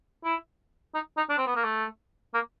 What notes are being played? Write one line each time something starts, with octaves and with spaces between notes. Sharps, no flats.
E4
D#4
D#4
D4
C4
B3
A#3
A3
A#3